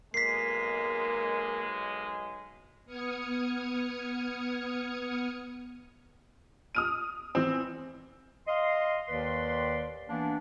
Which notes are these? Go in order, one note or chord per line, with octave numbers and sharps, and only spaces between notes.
B1 G#3 A#3 B6 C7
B3 D#6 F6 G#6 C#7
D#6 F6 D#7
E3 C4
D#5 F5 C6
D#2 D#3 B4 D5 C6
E3 A#3 B3 D4